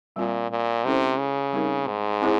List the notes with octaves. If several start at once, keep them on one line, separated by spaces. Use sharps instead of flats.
A#2 G3 C4 F4
A#2
C3 G#3 C#4 E4 A4 C5
C#3
G3 C4 D#4 G4 A#4
G#2
C4 E4 G#4 C5